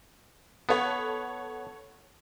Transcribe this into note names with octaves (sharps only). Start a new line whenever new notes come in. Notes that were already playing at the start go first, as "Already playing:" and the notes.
B3 A4 C#5 F#5